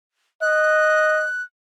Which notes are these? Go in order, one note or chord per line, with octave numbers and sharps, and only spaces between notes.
D#5 F#6